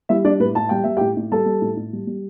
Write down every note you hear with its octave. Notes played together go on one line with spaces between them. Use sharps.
G3 E4 E5
G3 D4 D5
A2 B4
A2 A5
G3 G5
G3 E5
A2 G4 G5
A2
G3 A4 A5
G3
A2
A2
G3
G3